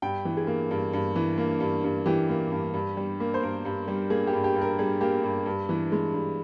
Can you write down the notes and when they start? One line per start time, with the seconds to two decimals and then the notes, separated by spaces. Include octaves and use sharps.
0.02 G2 G5
0.25 E3
0.37 G#4
0.47 A#3
0.71 G2
0.93 G2
1.16 E3
1.38 A#3
1.60 G2
1.84 G2
2.06 E3 G4
2.29 A#3
2.51 G2
2.74 G2
2.97 G3
3.20 A#3
3.34 C5
3.43 G2 A#4
3.65 G2
3.88 G3
4.10 A#3 G#4
4.27 G4
4.33 G2
4.44 G4
4.55 G2
4.61 A#4
4.79 G3 G#4
5.00 A#3 G4
5.24 G2
5.46 G2
5.69 E3
5.92 G#3
6.14 G2